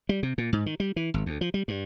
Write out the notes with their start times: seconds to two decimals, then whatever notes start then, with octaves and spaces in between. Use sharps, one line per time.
0.09 G3
0.23 C3
0.38 A#2
0.53 G#2
0.66 D#3
0.80 G3
0.96 E3
1.14 G#1
1.26 D2
1.41 F3
1.54 G3
1.68 G2